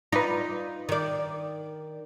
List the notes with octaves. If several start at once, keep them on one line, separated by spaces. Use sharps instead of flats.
D#4 F4 B4 D5 A#5
D#3 D5